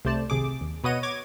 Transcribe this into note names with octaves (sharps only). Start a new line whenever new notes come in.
C2 C3 A3 C5 D5 A5
G#1 C3 G#4 D6
D#2
B2 B4 C#5 D#5 F#5 D#7
C#5 D6 G#6